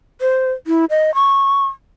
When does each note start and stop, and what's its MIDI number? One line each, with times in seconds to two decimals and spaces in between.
0.21 0.52 72
0.67 0.85 64
0.90 1.14 75
1.15 1.66 85